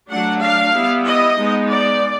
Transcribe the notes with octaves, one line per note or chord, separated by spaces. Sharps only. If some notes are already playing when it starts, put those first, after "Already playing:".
F#3 A3 D4 F#5
F5
G3 B3 E4
D#5
G#3 B3 D#4
D5